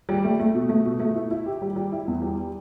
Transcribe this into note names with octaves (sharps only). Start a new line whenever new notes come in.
G3
A3
A3
B2
A3
B2
A3
E4
E4
G4
G3
G3
E4
E2
G3